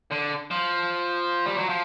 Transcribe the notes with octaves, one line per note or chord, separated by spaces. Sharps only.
D3
F3
G3
F#3
F3